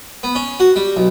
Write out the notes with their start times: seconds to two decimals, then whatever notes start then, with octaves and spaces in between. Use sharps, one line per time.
0.23 B3
0.35 C#4
0.60 F#4
0.76 G3
0.97 B1